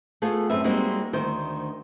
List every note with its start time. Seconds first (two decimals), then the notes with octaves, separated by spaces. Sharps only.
0.22 A3 B3 F4 G#4 A4
0.50 F#2 C4 B4 E5
0.64 G3 G#3 A#3 C4 D#4 F#4
1.13 D2 D#3 C5